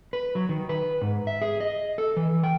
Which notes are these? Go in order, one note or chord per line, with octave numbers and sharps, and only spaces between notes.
B4
F#3
D#3
B4
G#2
E5
G#4
D#5
A4
E3
G5